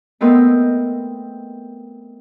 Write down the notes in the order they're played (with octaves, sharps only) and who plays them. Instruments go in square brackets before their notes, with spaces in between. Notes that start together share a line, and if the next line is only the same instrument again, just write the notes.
[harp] A3 B3 C4 A#4 D#5